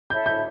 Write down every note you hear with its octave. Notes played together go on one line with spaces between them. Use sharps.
A4 C#5 E5 B5 G6
G6